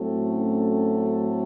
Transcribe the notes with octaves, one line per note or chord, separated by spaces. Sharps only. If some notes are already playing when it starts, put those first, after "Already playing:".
Already playing: A2 F#3 A3 C4
C#4